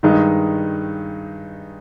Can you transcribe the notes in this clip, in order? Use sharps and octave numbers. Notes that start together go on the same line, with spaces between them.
G2 D#3 G#3 D#4